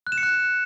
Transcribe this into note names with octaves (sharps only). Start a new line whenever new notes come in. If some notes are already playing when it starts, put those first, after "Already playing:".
F#6
E7
C#7
F#6